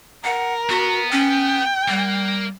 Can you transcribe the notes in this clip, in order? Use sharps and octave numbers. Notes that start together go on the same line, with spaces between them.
A#4 F#5
B3 F#4
C#4 G5
G3 A#3